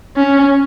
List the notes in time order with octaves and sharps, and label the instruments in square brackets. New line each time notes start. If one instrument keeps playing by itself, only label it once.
[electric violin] C#4